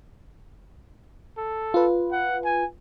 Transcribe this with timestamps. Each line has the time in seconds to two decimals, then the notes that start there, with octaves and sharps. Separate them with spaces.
1.37 A4
1.74 F4 B4
2.12 F#5
2.45 G#5